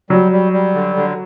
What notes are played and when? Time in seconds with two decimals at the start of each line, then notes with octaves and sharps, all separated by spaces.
0.10 F#3 G3
0.32 G3
0.53 G3
0.74 D3
0.96 D3